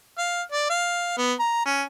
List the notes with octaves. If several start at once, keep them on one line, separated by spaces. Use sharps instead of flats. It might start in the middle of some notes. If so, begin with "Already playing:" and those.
F5
D5
F5
B3
A#5
C#4